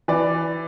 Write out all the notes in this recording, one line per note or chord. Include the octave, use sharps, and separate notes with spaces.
E3 D5